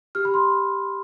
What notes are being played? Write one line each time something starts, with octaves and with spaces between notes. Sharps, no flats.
G4 F6
B5
C6